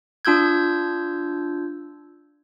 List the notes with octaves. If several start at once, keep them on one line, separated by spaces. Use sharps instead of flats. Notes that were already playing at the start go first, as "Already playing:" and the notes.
D4 F4 E6 G6 G#6